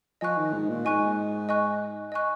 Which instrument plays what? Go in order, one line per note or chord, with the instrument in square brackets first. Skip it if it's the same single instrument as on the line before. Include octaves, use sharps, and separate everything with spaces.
[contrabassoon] F3 [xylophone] D#5 G#5 C#6 F#6
[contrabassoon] D#3
G#2
A#2
[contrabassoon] G#2 [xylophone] D#5 G#5 C#6 F#6
[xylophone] D#5 G#5 C#6 F#6
D#5 G#5 C#6 F#6